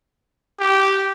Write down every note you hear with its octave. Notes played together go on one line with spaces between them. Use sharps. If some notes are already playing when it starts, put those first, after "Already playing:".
G4